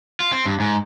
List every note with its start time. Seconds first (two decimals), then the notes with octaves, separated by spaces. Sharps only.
0.20 F4
0.32 C4
0.46 G2
0.60 G#2